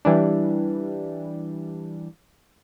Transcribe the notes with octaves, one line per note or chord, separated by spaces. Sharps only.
E3 G3 D4